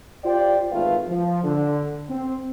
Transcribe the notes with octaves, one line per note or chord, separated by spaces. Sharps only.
F4 G4 C5 D5 G5
G#1 E2 A3 F4 B4 F5
F3
D3
C4